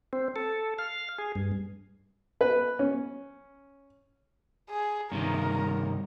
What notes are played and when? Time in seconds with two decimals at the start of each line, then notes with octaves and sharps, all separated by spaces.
0.13 C4
0.36 A4
0.79 F5
1.18 G#4
1.35 G2
2.41 B4
2.79 C#4
4.70 G#4
5.12 G2 C3 D#3 A#4